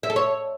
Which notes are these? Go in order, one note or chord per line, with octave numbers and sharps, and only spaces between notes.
E5
A4
C#5